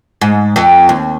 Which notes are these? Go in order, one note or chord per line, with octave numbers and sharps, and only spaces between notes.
G#2
F2
D#2